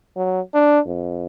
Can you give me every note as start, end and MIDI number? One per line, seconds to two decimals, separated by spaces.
0.16 0.40 54
0.54 0.80 62
0.87 1.27 41